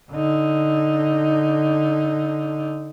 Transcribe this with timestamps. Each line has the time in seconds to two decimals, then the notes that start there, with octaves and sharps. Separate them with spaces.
0.12 D3 D#4